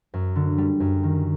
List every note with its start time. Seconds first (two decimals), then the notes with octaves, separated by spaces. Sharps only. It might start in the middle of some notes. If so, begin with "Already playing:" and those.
0.14 F#2
0.36 D3
0.58 G3
0.80 F#2
1.03 D#3